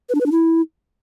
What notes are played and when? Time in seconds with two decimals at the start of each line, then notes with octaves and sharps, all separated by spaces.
0.09 B4
0.15 D4
0.20 B4
0.26 D4
0.32 E4